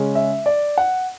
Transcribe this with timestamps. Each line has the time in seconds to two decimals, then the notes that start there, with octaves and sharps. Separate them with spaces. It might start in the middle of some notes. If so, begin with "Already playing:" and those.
Already playing: C#3 G#3 C#4
0.15 E5
0.46 D5
0.78 F#5